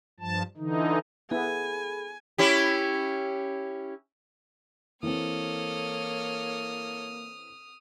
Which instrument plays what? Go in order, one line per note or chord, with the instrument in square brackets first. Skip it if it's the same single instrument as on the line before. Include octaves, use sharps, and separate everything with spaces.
[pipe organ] G2 F3 A5
D3 E3 D#4
[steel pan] B3 E4 [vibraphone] G#4 A4 B5 [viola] G#5
[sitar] C#4 E4 G4
[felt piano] E3 C4 [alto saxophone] A#3 [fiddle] A4 C#5 [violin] D#6 F6